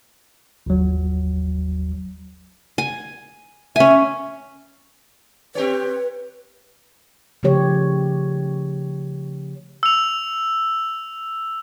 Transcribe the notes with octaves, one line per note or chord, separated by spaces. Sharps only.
G1 D#2 F#3
G#5
C#4 E5 G#5
C4 G4 B4 C#5
C#3 F3 A3 G4 C#5
E6 F7